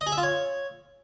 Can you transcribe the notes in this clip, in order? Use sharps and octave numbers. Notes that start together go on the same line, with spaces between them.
D#5
G#4
E5
F4
C#5